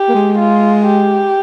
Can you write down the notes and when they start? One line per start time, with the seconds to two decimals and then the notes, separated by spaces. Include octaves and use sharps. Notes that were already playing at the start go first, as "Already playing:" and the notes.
Already playing: G4
0.09 A#3
0.15 G#3
0.38 F4
0.85 G4